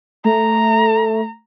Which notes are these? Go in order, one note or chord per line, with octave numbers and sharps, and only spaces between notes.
A3 A#5